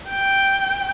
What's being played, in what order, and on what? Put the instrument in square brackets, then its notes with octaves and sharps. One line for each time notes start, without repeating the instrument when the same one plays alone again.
[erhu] G5